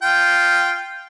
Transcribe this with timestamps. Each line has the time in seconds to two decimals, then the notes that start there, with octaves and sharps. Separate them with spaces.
0.02 F4 G5